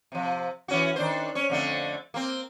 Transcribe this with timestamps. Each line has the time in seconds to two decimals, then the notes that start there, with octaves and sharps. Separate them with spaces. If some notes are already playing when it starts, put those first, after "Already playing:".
0.12 C3 F3
0.68 E3 C#4 F#4
0.96 D#3 D4 C5
1.35 C#4 C#5
1.50 F2 D3 A3
2.14 A#3 C4